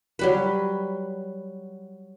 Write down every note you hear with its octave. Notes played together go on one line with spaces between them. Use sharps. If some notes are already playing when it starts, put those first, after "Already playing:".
F#3 G3 B4